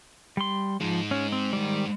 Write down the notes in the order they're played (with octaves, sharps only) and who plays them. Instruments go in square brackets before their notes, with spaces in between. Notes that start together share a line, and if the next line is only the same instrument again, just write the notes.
[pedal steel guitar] G3 C6
[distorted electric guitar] G#2 G#3 [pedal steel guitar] F3
[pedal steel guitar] C#4
C4
D#3 G3